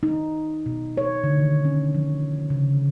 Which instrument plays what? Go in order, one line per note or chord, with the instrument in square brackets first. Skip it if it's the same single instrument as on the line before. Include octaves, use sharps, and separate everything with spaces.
[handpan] D#4
B2
C#5
D3
D#3
C#4
F3
C#3